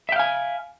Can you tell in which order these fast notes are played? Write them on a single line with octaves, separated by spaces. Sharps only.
E5 G5 F5 G#5